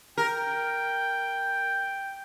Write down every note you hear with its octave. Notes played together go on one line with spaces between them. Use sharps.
A#4 G5